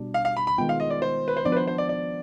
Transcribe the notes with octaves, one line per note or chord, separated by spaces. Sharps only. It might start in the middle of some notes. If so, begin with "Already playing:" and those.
Already playing: B2 G3 D4
F5
F5
B5
B5
D#3 G#3 B3 F4 G5
F5
D#5
D5
C5
B4
C5
F3 B3 D4 D5
B4
C5
C5
D5
D5